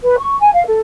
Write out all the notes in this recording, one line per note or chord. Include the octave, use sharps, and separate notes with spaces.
B4
C#6
G#5
F5
A4